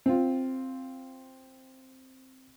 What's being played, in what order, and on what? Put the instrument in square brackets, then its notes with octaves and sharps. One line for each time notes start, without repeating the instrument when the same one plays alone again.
[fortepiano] C4 F4